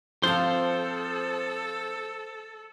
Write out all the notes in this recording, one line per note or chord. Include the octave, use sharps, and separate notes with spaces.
F3 C4 F4 A4 C5 A5